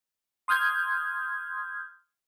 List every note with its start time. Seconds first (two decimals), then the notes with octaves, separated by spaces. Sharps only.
0.48 C6 D#6 F6 G6 G#6